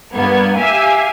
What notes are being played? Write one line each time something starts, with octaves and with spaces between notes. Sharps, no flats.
G2 A#3 B3 G#6
G4 E5 F5 G#5